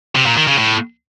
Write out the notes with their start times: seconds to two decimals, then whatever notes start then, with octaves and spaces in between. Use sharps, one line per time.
0.15 C3
0.26 A#2
0.37 D#3
0.47 C#3
0.58 A2